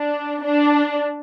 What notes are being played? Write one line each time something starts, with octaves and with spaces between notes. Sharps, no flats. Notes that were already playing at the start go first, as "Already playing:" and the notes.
Already playing: D4
D4